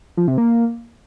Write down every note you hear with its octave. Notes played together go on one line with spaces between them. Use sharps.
F3
C3
A#3